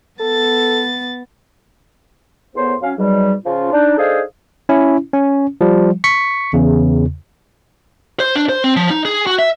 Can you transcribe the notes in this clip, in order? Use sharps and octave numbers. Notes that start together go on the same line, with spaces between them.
B3 A4 A6
E2 A2 B3 C5 C#5 C6
F#3 C#4 F5
G#2 B2 F#3 G3
C#3 F3 C#4 F4
D4 D#4
D4 D#4 G#4 A4 C5 F5
C#4 E4
C#4
F3 G3
C#6 B6 C#7
E2 C#3
C5
D4
C5
C4
F3
D#4
G#4
F#4
E5